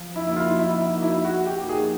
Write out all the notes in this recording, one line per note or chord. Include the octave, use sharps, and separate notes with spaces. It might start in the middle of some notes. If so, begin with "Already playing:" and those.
Already playing: F3
E4
A#3 D#4 E4 F#4
F4
F3 E4
E4
A#3 D#4 F#4
E4
F3 F#4
G4
A#3 D#4 F#4
G#4